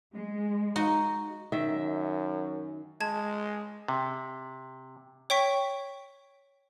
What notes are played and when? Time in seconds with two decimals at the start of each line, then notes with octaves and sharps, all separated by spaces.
0.14 G#3
0.76 D#4 F#4
1.52 F#2 D#3 E5
3.00 G#3 A5 G#6
3.88 C3
5.30 C#5 G5 C#6 B6